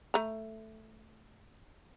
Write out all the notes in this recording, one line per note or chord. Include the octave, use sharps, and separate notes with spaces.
A3 A#5